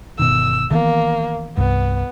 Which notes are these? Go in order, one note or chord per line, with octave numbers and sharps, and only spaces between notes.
G1 B2 D#3 E6
D#3 E3 A#3 B3
C2 G2 B3